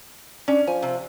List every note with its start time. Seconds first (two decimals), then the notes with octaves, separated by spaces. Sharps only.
0.48 C#4 D4
0.67 F3 G#5
0.82 C3